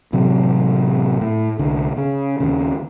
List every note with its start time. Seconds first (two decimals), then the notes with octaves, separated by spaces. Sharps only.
0.13 A1 C3 F#3
1.21 A2
1.59 C2 D3
1.97 C#3
2.40 D#2 C#3